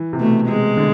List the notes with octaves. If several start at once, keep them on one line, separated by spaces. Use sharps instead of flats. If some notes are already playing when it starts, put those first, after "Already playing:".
Already playing: E3
C3
B2 A3
C3 G#3
D3